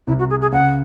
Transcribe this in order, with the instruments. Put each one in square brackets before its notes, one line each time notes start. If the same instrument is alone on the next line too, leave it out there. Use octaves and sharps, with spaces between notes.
[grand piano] C2 C3 [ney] E4
[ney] F#4
G#4
G#4
[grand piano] C#2 C#3 [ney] F#5